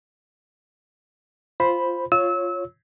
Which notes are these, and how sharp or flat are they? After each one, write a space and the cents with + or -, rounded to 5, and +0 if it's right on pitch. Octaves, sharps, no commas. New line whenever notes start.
F4 -5 C5 +0 B5 +0
F4 +0 C#5 -10 E6 -30